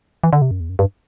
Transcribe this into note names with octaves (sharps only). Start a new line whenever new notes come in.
E3
D3
C3
F#2
E2
F#2
G2